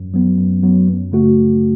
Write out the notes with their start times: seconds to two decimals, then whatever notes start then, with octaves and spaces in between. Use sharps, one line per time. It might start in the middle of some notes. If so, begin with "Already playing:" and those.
Already playing: F#2
0.14 F#3 B3
0.38 F#2
0.63 F#3 B3
0.87 F#2
1.12 C#3 A3 F#4